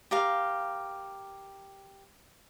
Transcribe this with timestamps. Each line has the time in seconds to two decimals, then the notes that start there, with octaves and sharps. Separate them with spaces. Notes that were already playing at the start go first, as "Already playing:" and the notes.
0.11 G4 A#4 F5